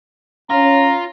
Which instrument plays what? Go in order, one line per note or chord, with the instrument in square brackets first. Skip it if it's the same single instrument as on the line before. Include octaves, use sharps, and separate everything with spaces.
[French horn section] C#4 [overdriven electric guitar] F4 [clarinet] A#5